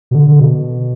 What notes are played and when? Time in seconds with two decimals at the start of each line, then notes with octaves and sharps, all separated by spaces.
0.11 B2
0.15 D3
0.28 D3
0.39 B2